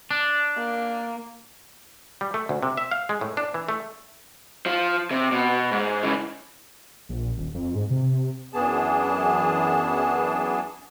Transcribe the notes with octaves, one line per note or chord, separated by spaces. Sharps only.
D4
A#3
G3
A3
D2
C3
E5
F5
G#3
A2
D4
E3
A3
F3
C3
B2
G#2
C#3 E3
A#1
D#1
F2
G#2
C3
C3
F#2 E3 B3 D4 G#4 A5